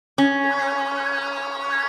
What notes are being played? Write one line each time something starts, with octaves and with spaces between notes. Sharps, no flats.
C#4